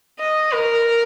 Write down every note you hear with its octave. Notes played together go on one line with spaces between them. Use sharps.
D#5
A#4